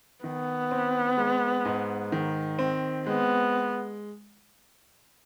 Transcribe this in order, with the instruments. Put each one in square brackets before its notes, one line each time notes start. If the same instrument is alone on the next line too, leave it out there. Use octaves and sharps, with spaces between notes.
[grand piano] D#3 [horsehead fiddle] B3
[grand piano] C4
G#3
G#2
D#3
C4
[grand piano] G#3 [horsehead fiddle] B3